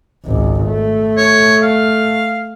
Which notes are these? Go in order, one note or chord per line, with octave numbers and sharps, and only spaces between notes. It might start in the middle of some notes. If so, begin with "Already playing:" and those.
G#1 C#2
A3
C#5
F5